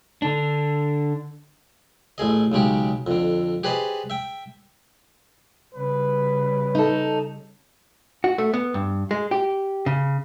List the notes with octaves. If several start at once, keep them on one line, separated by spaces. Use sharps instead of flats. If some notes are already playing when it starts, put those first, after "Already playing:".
D3 D4
A1 A3 G#4 D#5
B1 C#3 G#3 G4
F2 D3
G4 G#4 B4 C5 D5 D#5
E5 G5
C#3 G3 B4
D#4 A4
F#4
A3
B3
G2
G#3
G4
C#3